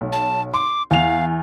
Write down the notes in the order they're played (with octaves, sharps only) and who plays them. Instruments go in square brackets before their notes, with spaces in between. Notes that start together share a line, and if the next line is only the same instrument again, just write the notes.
[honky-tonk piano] B1
[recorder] A5
[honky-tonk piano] C6 [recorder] D6
[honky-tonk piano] E2 F7 [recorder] F5